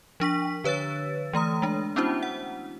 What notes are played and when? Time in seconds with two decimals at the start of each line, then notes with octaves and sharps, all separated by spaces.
0.20 F3 D4 C#6 B6
0.64 D3 B4 C#5 E6 A6
1.33 E3 A3 A#5 D#6
1.62 G#3 D4
1.96 B3 C#4 D4 E4 F#4 C5
2.23 F#5